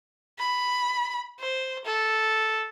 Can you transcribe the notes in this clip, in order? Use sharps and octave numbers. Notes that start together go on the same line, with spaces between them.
B5
C5
A4